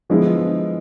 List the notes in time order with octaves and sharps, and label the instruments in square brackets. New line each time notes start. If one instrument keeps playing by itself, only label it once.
[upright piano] D3 F3 G#3 B3 E4